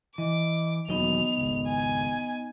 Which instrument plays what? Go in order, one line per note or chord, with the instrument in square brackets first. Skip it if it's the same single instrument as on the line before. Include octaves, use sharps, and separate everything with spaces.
[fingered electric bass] E3 [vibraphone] D#5 [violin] D6
[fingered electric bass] E1 D#2 F#3 [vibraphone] B3 D#4 D#5 [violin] F7
[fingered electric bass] G#1 C#2
[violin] G#5